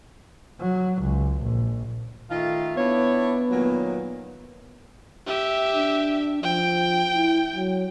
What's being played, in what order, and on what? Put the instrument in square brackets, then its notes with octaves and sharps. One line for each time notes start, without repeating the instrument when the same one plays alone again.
[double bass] F#3
C#2
A#1
[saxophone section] D#3 A3 F4
[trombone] B3 [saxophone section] D4 E4 C#5
[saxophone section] A#2 D#3 F#3
[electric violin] G4 E5
[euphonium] D4
[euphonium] F3 [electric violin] G5
[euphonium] E4
F#3